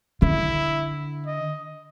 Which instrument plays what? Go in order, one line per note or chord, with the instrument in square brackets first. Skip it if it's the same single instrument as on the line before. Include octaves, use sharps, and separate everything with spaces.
[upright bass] D3 [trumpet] E4
[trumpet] D#5